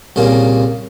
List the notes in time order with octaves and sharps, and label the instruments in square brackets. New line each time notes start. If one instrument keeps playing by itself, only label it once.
[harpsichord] C2 A#2 C#3 A#3